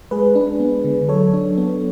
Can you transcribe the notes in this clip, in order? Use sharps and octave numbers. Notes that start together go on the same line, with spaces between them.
G#3 G#4 B4
D4
B3
D3
F#3 A4 C#5
D4
B3